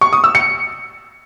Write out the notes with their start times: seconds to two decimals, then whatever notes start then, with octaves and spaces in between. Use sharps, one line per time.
0.01 C#6
0.13 D#6
0.24 E6
0.35 C#7